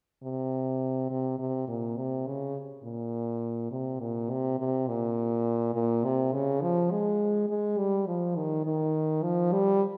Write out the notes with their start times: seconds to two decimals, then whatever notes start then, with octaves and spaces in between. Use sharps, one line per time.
0.23 C3
1.10 C3
1.39 C3
1.68 A#2
1.96 C3
2.26 C#3
2.83 A#2
3.71 C3
4.00 A#2
4.30 C3
4.59 C3
4.87 A#2
5.74 A#2
6.04 C3
6.32 C#3
6.61 F3
6.91 G#3
7.49 G#3
7.78 G3
8.07 F3
8.36 D#3
8.65 D#3
9.23 F3
9.52 G3